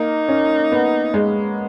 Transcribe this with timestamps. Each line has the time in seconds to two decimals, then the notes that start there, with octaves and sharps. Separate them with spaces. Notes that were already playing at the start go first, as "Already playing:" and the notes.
Already playing: A#3 D#4
0.29 C#4
0.72 B3
1.14 G#3